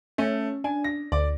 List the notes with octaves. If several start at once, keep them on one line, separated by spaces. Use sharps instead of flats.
A3 C#4
D4 G#5
A#6
D2 D5